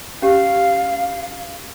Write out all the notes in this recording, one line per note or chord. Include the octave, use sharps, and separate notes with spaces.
C#4 G4 F5